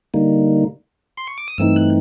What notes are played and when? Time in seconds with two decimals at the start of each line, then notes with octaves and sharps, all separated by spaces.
0.14 D3 G3 A#3 D#4
1.17 C6
1.27 C#6
1.38 D6
1.48 D#6
1.58 G2 E3 A3 C4 D#4 E6
1.76 F#6